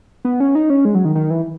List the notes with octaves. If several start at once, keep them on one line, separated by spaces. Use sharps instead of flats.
B3
C#4
D#4
C#4
G#3
F#3
D#3
D#3
E3